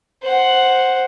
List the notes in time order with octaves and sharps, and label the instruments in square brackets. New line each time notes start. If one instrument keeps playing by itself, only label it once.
[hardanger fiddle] C5 F#5